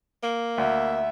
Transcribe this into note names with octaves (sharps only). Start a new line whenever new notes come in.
A#3
D2 E5